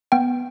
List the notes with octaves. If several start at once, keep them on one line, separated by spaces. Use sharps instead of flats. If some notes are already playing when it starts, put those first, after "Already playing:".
B3 G5